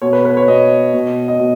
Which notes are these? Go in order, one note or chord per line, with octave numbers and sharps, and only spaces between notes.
B2 C#5
B4
B4
C#5
B2 D#5
B2
D#5
B2